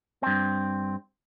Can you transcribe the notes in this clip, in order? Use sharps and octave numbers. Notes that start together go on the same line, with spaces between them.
G2 C4